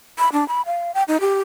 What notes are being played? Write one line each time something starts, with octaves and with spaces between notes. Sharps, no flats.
B5
D4
B5
F5
G5
D#4
G4